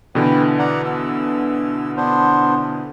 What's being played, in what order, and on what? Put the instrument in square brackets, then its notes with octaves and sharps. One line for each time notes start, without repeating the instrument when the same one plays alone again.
[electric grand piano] B2 D3 E3 [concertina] B4 G5
[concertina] D5 F#5 A#5
E6
B3 D4 C5